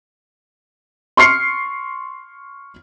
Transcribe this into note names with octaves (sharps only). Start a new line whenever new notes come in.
C6 C#6 F6 C7 C#7